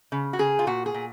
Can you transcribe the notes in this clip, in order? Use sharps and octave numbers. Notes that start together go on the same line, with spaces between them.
C#3
F#4
C#3 G#4
F4
A#2 F#4
G#4
A#2